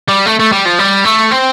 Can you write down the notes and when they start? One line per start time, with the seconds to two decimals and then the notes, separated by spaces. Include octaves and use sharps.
0.08 G3
0.26 A3
0.39 A3
0.52 G3
0.65 F3
0.79 G3
1.05 A3
1.31 C4